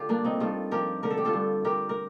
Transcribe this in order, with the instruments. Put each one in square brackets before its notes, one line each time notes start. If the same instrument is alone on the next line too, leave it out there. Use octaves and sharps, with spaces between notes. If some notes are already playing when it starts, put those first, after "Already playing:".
Already playing: [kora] D3 F4 G4
G2 A#3 D4
C4 D#4
G2 F4 A4
F3 G4 A#4
D3 A#4
A4
G4
F4 A4
G2
G2 G4 A#4
A#4